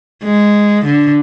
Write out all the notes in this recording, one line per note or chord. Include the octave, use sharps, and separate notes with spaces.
G#3
D3